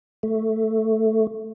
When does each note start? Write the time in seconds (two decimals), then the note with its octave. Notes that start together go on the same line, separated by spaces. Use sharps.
0.23 A3